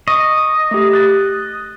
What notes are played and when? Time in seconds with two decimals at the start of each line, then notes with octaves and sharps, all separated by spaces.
0.08 D#5 C#6
0.71 A3 G4
0.93 F#6 A6